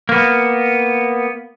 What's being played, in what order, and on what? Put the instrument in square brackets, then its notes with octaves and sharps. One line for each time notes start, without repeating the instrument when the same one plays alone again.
[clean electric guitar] A#3 B3